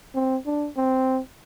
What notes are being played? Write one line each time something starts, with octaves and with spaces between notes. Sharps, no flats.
C4
D4
C4